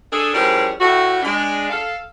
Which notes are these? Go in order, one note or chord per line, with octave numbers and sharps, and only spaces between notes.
D4 G#4 A4
E3 F3 G3 C#4 G#4 A#4
A2 F#4
G#3 D4
A4 F5